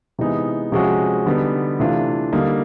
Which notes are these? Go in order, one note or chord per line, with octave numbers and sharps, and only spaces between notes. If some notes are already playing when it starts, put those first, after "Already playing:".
C3 E3 G#3 B3 D#4
C3 F3 G#3 C#4 F#4
D3 G3 B3 D#4
C3 E3 A3 D4 F4
D3 G3 A#3 D#4